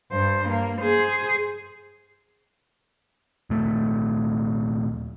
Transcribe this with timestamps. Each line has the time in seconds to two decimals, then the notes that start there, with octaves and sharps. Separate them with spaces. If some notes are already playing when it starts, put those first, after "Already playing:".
0.11 G2 C5
0.49 A#3
0.81 G#4 C5
3.50 D#1 A3